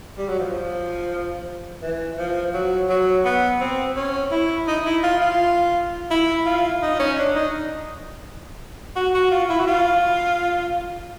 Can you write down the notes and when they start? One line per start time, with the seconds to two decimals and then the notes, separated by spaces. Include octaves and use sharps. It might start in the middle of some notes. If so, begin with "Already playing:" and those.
0.18 G3
0.29 F#3
0.40 F3
1.82 E3
2.18 F3
2.54 F#3
2.90 F#3
3.25 B3
3.61 C4
3.96 C#4
4.32 E4
4.67 D#4
4.85 E4
5.03 F4
5.21 F4
6.11 E4
6.46 F4
6.82 D#4
6.99 C#4
7.18 D4
7.36 D#4
8.96 F#4
9.14 F#4
9.31 F4
9.50 E4
9.60 F#4
9.67 F4